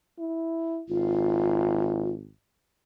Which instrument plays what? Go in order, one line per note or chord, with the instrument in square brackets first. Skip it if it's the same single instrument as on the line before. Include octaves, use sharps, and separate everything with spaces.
[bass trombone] E4
[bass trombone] G#1 [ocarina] F4